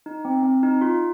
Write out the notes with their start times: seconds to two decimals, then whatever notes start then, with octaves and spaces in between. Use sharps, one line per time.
0.06 D#4
0.25 C4
0.43 C4
0.63 D#4
0.81 F4